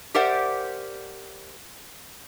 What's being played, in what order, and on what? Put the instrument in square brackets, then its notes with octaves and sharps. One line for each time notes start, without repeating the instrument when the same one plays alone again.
[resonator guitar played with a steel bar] G4 A#4 C5 D5 E5 F#5